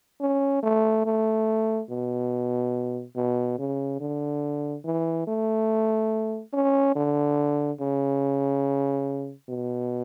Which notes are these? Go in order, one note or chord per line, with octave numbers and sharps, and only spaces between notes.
C#4
A3
A3
B2
B2
C#3
D3
E3
A3
C#4
D3
C#3
B2